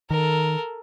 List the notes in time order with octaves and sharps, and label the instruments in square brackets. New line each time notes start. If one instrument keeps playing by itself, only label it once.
[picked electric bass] D#3 [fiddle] A4 A#4